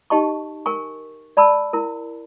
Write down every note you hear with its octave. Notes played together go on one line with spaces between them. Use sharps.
D#4 G4 D#5 A5 C#6
A#4 G#5 C#6
D5 A5 B5 E6
E4 A#4